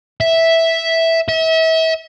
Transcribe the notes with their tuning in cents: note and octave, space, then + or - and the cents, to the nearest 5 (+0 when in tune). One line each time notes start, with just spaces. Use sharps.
E5 -5
E5 -35